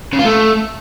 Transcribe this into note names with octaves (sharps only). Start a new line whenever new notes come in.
C#3
F4
A3